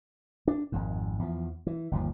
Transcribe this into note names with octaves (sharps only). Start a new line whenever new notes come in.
D4
G#1 F2 G#2
E2 F3
E3
G1 D#2 F3